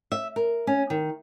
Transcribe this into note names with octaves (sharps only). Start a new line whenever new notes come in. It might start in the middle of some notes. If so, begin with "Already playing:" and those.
E5
A#4
C#4
D#3